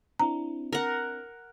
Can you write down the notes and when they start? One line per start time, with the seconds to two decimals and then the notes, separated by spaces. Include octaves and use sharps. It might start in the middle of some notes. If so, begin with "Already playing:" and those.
0.19 C4 D4 E4 A#5
0.73 A#4 F#5